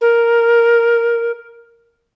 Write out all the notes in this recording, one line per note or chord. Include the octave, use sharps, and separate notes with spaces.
A#4